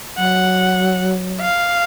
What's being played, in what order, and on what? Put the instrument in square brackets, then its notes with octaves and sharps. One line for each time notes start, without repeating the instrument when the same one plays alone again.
[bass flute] F#3 [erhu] F#5
[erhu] F5